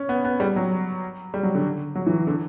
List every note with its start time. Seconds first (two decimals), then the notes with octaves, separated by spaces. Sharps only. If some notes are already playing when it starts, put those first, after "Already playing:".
Already playing: C#4
0.09 B3
0.24 B3
0.40 G3
0.56 F#3
1.34 G3
1.43 F#3
1.55 D3
1.95 F#3
2.06 E3
2.27 D3